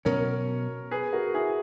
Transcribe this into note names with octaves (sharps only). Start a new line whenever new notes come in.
B2 F#3 C#4 A#4 C#5
G#4 B4
F#4 A#4
E4 G#4